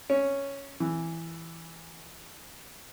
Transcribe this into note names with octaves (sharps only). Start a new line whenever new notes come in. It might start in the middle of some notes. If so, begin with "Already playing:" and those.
C#4
E3